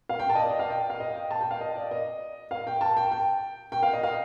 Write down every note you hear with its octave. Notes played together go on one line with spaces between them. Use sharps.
F5
G5
A5
D#5
D5
D#5
F5
G5
F5
D#5
G5
A5
G5
F5
D#5
D5
D#5
F5
G5
A5
G5
G5
G5
F5
D#5
F5